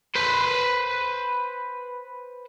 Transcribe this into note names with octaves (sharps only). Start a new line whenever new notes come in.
B4 C5